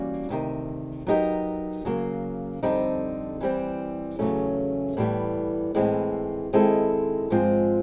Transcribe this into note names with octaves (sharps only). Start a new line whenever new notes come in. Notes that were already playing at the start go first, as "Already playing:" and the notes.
Already playing: E3 G3 A#3 C#4 F#4
D2 C3 D#3
F#3 B3 D#4 G4 A#4
C#3 F#3 A#3
F2 D3 G3 C4 D#4
E3 G3 C4
E2 C#3 F#3 A3 C#4
A2 E3 G3 B3
A2 E3 G#3 C4
D#3 G#3 C4 E4 A4
G#2 F3 G#3 C4 F4